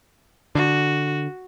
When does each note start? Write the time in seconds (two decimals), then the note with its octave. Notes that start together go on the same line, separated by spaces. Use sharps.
0.55 D3 F#4